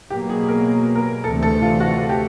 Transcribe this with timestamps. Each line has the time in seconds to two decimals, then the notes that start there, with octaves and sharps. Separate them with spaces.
0.10 B2 F#3 A#3 G4
0.29 G#4
0.48 A#4
0.95 A#4
1.24 D2 C3 E3 A3 A4
1.43 A4
1.62 F4
1.80 F#4
2.09 G4